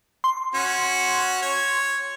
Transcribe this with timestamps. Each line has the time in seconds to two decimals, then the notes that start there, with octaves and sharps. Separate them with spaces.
0.24 C6
0.55 C#4 F#4
1.42 C#5